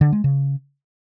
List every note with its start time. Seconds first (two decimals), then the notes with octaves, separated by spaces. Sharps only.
0.01 D3
0.12 G#3
0.24 C#3